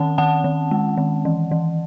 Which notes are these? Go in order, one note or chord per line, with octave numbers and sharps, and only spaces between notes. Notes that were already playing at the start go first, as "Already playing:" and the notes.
Already playing: D#3 C#4 F#5 A5
D#3 F#5 A5
D#3
G#3
D#3
E3
E3